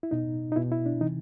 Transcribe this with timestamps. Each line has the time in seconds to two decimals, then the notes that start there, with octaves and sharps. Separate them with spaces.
0.03 E4
0.11 B2 D#4
0.52 D#4
0.56 B2 E4
0.72 E4
0.86 D4
1.01 C3 E3 D#4